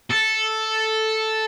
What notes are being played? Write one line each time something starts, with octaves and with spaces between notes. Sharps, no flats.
A4